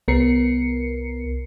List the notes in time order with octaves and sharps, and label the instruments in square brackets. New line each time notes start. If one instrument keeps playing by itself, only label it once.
[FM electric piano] C2 B3 A#4 C7 C#7